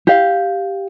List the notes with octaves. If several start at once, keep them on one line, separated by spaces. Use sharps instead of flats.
G4 F5